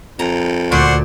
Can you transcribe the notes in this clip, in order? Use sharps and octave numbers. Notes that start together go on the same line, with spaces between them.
F2 A#5
D2 A#2 C5 D5 F#5 C#6